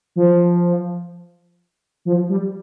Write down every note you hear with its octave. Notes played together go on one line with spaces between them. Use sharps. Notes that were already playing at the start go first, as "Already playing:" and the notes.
F3
F3
G3